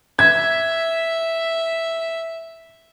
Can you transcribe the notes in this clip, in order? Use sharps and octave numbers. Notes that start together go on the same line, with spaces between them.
E5 G#6